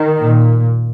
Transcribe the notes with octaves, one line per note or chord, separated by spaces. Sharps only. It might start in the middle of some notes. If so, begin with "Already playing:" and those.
Already playing: D#3
A#2